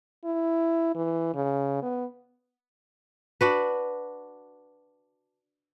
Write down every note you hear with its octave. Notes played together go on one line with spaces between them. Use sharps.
E4
E3
C#3
B3
D4 F#4 B4